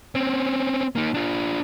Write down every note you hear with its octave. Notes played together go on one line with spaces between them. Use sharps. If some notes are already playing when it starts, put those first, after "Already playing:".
C4 C#4
A#3 D#4
D4 F4